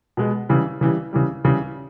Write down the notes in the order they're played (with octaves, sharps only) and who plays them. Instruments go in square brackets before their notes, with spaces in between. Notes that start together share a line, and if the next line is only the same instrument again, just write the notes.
[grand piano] B2 G#3 B3
C#3 E3 G3
C#3 E3 G3
C#3 E3 G3
C#3 E3 G3